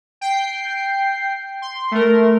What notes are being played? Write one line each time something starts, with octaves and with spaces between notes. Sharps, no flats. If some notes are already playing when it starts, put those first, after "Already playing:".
G5 C7
C6
A3 A#4